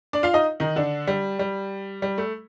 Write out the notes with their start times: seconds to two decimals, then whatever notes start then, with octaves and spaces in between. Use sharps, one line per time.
0.13 D4 D5
0.23 F4 F5
0.33 D#4 D#5
0.60 D#3 D#4
0.76 D3 D4
1.07 G3
1.39 G3
2.02 G3
2.18 A3